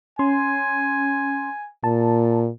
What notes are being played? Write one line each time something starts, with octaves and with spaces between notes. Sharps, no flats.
C#4 G#5 C6
A#2 A5